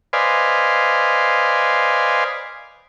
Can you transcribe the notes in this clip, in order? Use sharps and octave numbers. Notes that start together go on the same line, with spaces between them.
B4 C5 D5 D#5 F5 G#5